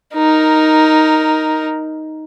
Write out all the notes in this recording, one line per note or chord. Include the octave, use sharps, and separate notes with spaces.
D#4 A#4